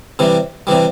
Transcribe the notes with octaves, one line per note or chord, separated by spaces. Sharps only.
C3 E3 G3
C3 E3 G3